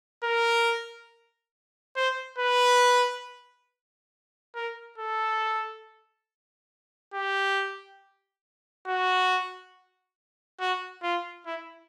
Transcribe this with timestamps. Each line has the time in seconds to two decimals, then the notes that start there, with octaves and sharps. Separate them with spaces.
0.23 A#4
1.96 C5
2.39 B4
4.55 A#4
4.98 A4
7.14 G4
8.87 F#4
10.60 F#4
11.03 F4
11.46 E4